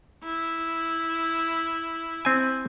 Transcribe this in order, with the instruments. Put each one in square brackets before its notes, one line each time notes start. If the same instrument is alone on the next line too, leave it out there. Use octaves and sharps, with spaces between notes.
[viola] E4
[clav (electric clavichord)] C4 G#5